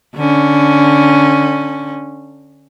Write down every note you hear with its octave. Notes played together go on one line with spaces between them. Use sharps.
D3 C#4